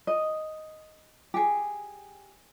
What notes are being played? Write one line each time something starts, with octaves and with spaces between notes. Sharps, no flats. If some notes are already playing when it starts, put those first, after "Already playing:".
D#5
G4 G#4